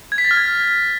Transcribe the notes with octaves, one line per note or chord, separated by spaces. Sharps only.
G#6
B6
A6
F6
G#6